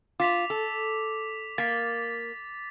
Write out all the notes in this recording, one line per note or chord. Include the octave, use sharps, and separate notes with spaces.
F4 D6 B6 F7
A4
A#3 A6 B6